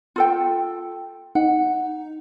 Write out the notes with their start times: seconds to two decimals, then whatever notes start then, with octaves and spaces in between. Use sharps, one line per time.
0.16 F4 A4 G5
1.35 D#4 F#5